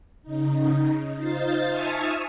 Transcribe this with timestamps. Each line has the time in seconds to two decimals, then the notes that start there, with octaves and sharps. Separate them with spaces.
0.23 C#3 D#4
1.16 D#4 F4 C5 A6 C7
1.68 E5 G#5 A5 C#6 D#6 F6